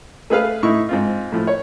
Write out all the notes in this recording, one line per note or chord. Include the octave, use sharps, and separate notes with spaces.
A3 G#4 B4 F5
A2 D#4 E4 C#6
G#2 C4 F4
A2 F3
C#5